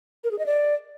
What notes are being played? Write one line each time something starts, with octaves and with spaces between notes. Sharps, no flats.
A#4
G#4
D#5
D5